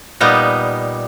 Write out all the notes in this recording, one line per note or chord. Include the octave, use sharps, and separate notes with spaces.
A#2 G3 B3 D#4